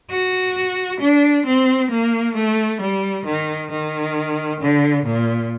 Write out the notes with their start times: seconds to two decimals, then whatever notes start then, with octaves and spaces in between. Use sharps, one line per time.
0.11 F#4
1.00 D4
1.46 C4
1.91 A#3
2.35 A3
2.81 G3
3.26 D#3
3.71 D#3
4.61 D3
5.06 A#2